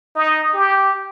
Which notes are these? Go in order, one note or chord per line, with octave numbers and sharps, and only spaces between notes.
D#4
G4